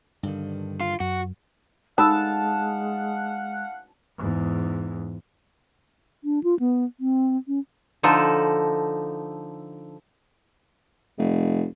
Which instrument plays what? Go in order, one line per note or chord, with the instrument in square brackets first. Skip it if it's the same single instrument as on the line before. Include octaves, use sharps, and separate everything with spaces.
[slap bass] G2 D3 D#3
[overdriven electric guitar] F4
[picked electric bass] F#2 [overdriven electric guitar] F#4
[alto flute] G#3 [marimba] D#4 B5 E6 [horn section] F5 F#5 [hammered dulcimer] A5
[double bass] E2 G#2
[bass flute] D4
F4
B3
C4
C#4
[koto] D3 F3 D#4 A4
[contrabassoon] F1